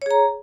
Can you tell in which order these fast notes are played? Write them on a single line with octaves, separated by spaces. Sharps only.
C#5 G#4 A#5